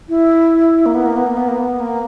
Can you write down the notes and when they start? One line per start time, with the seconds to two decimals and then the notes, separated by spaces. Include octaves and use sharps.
0.09 E4
0.86 A#3
0.95 B3
1.06 A#3
1.16 B3
1.27 A#3
1.37 B3
1.48 A#3
1.59 B3
1.80 A#3